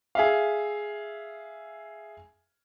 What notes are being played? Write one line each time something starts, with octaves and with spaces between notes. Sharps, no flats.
G#4 E5 F5